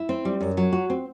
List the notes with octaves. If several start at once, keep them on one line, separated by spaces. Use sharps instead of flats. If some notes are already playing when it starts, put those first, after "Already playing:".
Already playing: E4
C4
G3
F#2
F#3
F#4
C4